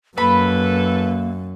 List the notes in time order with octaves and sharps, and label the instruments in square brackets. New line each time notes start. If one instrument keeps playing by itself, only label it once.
[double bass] F#2 [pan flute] A#3 [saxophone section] A4 B4 [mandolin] B5